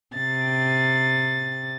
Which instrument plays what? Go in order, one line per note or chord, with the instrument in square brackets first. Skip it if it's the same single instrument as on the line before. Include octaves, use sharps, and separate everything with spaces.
[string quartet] C3 A6